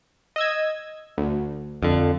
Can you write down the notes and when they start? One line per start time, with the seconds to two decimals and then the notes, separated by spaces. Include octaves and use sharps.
0.36 D#5 E6 G#6
1.18 D2
1.83 F2 D3